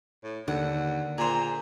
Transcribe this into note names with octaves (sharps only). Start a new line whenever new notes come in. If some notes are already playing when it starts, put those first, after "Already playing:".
A2
D#2 D3 F#5
A#2 G#4 C5 A#5